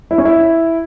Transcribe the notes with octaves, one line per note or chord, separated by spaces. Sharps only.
E4
C#4
E4